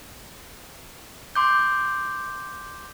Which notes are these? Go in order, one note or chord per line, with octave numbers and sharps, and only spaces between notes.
C6 D6 G6